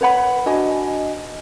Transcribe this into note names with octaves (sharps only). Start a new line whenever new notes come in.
B4 C#5 F#5 B5
D4 F#4 D#5 G#5